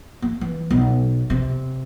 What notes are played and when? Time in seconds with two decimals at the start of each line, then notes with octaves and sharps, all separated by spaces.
0.22 A#3
0.41 E3
0.71 B1
1.30 C3